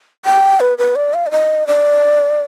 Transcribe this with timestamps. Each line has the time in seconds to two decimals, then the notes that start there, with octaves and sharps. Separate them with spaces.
0.25 G5
0.60 B4
0.78 B4
0.96 D5
1.14 F5
1.26 D5
1.31 D#5
1.67 D5